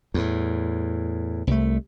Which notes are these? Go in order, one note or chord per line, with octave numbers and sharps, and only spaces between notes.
E2 A2
C2 A3